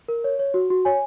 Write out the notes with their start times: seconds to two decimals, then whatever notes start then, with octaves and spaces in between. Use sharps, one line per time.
0.08 A#4
0.24 C#5
0.39 C#5
0.54 F#4
0.70 F#4
0.85 C#5 G#5